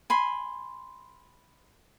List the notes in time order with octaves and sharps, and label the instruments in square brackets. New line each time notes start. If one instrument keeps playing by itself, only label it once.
[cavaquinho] G#5 B5 C6